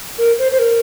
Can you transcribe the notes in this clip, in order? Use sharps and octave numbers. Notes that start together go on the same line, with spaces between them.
A#4
C5
C5
A#4